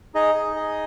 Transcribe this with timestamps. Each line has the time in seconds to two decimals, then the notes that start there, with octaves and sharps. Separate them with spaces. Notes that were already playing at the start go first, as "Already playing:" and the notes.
0.14 D#4 G#4 D#5
0.35 G#4
0.56 G#4